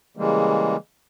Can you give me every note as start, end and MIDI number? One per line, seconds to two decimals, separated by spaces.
0.17 0.76 49
0.17 0.76 52
0.17 0.76 55
0.17 0.76 56
0.17 0.76 58